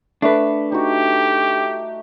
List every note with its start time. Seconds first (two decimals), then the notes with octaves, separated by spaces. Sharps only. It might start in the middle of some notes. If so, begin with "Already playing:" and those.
0.22 A3 D4 B4
0.72 D#4 F#4 G4